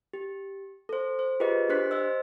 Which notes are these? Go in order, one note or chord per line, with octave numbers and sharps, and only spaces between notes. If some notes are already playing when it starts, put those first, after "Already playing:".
G4
A4 C5
C5
F4 G4 G#4 A#4 B4 D#5
D4 G4 C5 F#6 B6
C5 D#5 E6